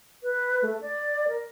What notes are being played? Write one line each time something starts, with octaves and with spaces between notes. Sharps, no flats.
B4
A3
D5
A#4